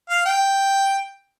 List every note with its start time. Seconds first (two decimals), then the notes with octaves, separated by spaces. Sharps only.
0.10 F5
0.26 G5